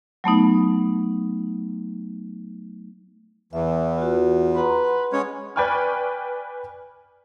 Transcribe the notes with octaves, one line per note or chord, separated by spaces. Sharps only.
F#3 A3 B3 D#4
E2 E3 E5
F4 F#4
B4 F#5 A#5 C6
F#5 C6
G#3 C#4 C#5
B4 D5 G5 G#5 C#6 F6